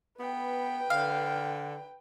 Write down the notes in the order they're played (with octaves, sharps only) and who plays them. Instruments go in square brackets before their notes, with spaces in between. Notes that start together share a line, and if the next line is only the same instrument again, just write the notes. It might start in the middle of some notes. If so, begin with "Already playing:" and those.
[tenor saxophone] B3 [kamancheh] B4 G5
[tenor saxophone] D3 [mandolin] F5